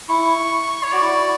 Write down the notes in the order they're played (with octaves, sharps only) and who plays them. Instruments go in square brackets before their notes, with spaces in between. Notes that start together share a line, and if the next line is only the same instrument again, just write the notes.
[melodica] E4 [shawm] C#6
[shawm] C#5
[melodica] F#4 [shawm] D5
[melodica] E4
F#4